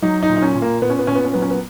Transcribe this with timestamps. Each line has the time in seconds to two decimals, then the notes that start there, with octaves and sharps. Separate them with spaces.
0.02 F#3 D#4
0.23 D#4
0.29 A#2
0.37 D#4
0.42 C#4
0.55 A#2
0.62 A#3
0.82 A#2 B3
0.90 C#4
0.99 B3
1.07 A#2 C#4
1.15 B3
1.25 C#4
1.33 F#3 B3
1.42 C#4
1.50 B3